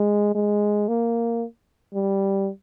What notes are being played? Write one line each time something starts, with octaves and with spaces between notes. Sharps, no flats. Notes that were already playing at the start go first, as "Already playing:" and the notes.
Already playing: G#3
G#3
A#3
G3